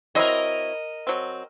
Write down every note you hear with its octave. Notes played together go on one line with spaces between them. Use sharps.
F#3 C4 E4 A#4 D#5
F#3 C4